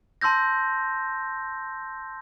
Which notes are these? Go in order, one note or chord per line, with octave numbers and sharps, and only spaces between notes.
A5 C6 E6 G6 A#6